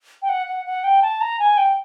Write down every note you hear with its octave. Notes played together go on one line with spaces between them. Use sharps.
G5
F#5
F#5
F#5
G5
A5
A#5
G#5
G5